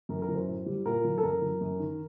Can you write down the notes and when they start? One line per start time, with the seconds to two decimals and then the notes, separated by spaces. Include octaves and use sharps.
0.09 F#2 A#4
0.22 A#4
0.28 F#3
0.35 C5
0.47 A2
0.66 G3
0.85 A#2 A#4
1.05 F#3
1.18 A4
1.23 F#2 A#4
1.42 F#3
1.61 F#2
1.80 D#3